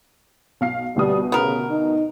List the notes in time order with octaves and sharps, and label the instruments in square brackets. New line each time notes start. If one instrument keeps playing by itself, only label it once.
[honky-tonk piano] B1 F5 C7
[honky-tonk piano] D2 B2 D#6 [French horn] G3
[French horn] C#3 [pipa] B3 A#4
[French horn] D#4